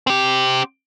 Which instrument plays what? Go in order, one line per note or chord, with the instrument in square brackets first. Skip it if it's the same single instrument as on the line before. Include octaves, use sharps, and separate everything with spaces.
[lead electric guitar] C4 G4